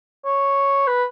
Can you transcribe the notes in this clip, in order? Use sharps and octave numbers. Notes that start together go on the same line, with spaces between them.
C#5
B4